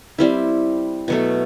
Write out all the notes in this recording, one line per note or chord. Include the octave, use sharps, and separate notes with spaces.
G3 C4 E4
B2 F#3 A3